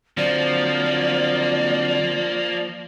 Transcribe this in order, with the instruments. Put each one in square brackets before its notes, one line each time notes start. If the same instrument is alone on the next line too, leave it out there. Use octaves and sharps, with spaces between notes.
[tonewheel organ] D3 F#3 C4 [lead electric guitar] F3 [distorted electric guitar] A#3 [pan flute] D5